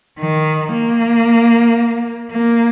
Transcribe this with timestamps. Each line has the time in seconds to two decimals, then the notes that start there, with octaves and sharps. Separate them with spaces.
0.20 D#3
0.73 A#3
2.31 A#3